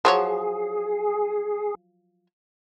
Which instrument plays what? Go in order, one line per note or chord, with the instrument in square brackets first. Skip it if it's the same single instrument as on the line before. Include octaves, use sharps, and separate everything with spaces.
[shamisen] F3 F#3 C#5 [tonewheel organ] G#4